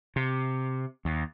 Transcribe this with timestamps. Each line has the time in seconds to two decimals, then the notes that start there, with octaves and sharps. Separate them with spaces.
0.16 C3
1.05 D#2